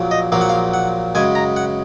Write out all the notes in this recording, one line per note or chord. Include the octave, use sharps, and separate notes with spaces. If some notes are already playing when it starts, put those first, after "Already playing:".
Already playing: A#1 A#2 F#3 A#3
D#5
A#1 A#2 F#3 A#3 F5
F#5
F5
F#5
F#2 C#3 G#3 G#5
A#5
F#5